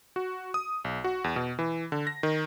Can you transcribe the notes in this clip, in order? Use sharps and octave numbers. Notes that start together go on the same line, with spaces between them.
F#4
D#6
B1
F#4
E2
B2
E3
D3
A#6
D#3